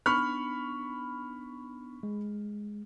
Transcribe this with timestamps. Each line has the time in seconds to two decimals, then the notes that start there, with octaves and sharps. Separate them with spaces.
0.06 B3 D4 D#4 B5 C#6 F6
2.03 G#3